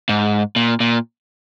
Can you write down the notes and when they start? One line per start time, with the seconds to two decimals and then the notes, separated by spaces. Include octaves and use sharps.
0.09 G#2
0.56 A#2
0.80 A#2